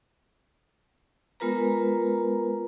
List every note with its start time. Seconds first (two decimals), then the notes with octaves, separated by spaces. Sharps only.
1.40 G#3 B3 F4 A#4 B4 A#5